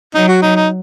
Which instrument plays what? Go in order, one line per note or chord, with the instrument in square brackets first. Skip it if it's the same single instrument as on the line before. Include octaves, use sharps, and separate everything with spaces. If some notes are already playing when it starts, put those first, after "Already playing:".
[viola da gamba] F#3 [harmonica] D#4
[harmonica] F#4
D#4
D#4